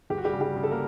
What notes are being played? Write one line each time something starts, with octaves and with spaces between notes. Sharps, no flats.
G1 G4
F#4
G3 G4
C#3
G3 G4
C#3
A4
A#3 A#4